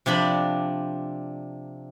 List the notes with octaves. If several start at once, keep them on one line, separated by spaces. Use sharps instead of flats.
C3 F3 D4 B5